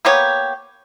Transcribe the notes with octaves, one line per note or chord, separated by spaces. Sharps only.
A#3 B3 G4 C#5